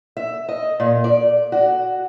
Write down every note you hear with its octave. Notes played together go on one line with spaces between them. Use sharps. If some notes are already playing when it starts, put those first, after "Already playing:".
E5
D#5
A#2
D5
F#4